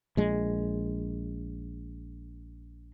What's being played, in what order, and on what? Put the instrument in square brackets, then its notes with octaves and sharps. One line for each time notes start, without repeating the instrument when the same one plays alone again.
[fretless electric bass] A#1 G#3